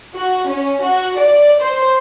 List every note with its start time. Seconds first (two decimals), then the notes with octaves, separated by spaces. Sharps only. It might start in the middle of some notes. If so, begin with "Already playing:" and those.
0.15 F#4
0.48 C#4
0.83 F#4
1.18 D5
1.61 C5